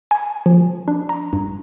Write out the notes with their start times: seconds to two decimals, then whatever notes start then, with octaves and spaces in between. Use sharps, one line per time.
0.11 G#5
0.46 F3
0.88 D4
1.09 A#5
1.33 G2